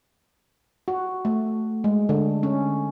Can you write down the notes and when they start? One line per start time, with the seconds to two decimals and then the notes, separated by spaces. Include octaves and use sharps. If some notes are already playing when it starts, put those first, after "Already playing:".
0.88 F#4
1.25 A3
1.84 G#3
2.09 D3
2.43 C#4